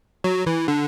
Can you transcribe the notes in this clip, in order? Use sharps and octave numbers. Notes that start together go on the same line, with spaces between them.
F#3
E3
D3